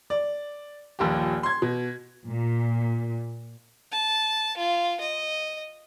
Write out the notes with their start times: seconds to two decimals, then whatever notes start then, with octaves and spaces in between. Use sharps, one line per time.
0.10 D5
0.99 D#1 A#1 D#2 G4
1.43 C6 G#6
1.62 B2
2.29 A#2
3.92 A5
4.57 F4
5.00 D#5